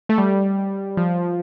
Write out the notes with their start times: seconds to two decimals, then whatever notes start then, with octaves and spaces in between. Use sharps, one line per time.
0.09 A3
0.18 G3
0.97 F3